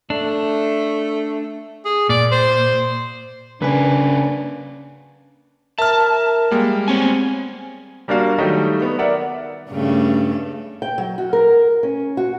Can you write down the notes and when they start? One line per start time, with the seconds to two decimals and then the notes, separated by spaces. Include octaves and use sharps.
0.10 A3 D4
1.85 G#4
2.09 A#2 D5
2.31 C5
3.62 C#3 A#3 C#4 D4 B4 G#5
5.78 A#4 E5 A5 F6
6.51 G3 G#3 A#3
6.88 B3 C4 C#5 G#5
8.08 G3 A#3 D4 F#4 F5
8.38 D#3 F#3 G3 A3 D#4
8.82 B3
8.99 A#4 D5 E5 F#5
9.70 G2 C#3 A3
10.82 G5
10.98 F#3
11.18 F#4
11.33 A#4
11.83 C#4
12.17 F#4